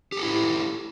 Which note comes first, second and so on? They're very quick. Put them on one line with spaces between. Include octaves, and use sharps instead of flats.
G4 A4 E4